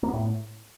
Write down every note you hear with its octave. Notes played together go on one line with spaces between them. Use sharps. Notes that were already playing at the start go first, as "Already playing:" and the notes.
A#3
B3
A2